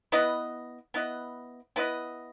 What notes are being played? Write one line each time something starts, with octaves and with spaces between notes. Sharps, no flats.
B3 E4 B4 D#5
B3 E4 B4 D#5
B3 E4 B4 D#5